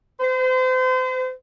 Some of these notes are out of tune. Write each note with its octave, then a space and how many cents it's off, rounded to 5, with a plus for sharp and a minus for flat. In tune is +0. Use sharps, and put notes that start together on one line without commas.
C5 -35